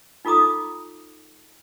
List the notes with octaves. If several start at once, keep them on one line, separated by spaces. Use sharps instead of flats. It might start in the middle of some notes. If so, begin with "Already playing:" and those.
D#4 F4 A4 A#5 D6 D#6